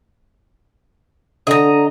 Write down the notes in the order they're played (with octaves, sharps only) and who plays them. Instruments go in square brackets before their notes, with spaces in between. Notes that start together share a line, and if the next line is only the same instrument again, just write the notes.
[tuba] D3 [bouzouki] D#5 A#5